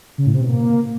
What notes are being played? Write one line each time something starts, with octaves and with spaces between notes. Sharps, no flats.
C#3
A2
C3
B2
A#3